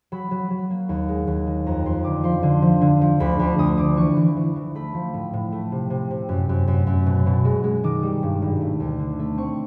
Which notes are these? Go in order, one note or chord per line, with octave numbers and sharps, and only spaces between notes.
F#3 B5
F#3
F#3
A#3
D#2
G#3
D#2
D#3
F2 A#5
F2 C6
D3 D6
F3 C6
D3
F3
D3
F3
D2 B5
D2 D6
D2 D#6
D3 D6
E3 C#6
E3
E3
E3
A3 B5
F3
A2
A2
A3
C3
C3
C3
F#2
F#2
F#2
F#2
B2
B2
G#3
G#3
D#3 D6
G3
G2
G#1
A3
D2
D3
A3
C4 C#6